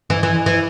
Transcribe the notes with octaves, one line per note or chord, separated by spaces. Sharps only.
E3
E3
E3